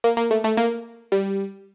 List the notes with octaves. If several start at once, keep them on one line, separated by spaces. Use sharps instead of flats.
A#3
A#3
A3
A3
A#3
G3